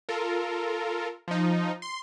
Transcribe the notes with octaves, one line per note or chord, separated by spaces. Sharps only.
F4 A4 A#4
F3 D#4
C6